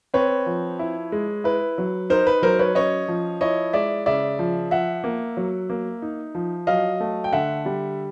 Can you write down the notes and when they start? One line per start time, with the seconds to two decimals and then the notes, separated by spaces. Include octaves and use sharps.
0.14 C4 B4 C#5
0.46 F3
0.79 E4
1.12 G#3
1.44 E4 B4
1.78 F#3
2.10 D#4 A#4 C5
2.27 B4
2.42 F#3 A#4 C5
2.59 B4 C#5
2.75 C#4 C#5 D#5
3.08 F3
3.41 E4 C#5 D#5
3.73 G#3 D5 E5
4.06 C#3 D5 E5
4.39 F3
4.71 F3 E5 F#5
5.04 A#3
5.37 F#3
5.70 A#3
6.02 D#4
6.35 F3
6.67 F#3 D#5 F5
7.00 A3
7.24 G5
7.33 D3 E5 F#5
7.66 G3